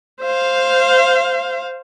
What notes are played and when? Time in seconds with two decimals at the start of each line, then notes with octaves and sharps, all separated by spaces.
0.21 C5 F5